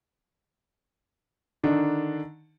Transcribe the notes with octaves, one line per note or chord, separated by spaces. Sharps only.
D3 D#3 D4 D#4